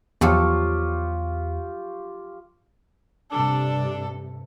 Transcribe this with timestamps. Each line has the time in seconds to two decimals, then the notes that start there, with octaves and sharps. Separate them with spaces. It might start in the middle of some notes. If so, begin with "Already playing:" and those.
0.21 E2 F3 F#3 F4 G4 A4 C#6
3.32 G2 C3 G3 D4 A4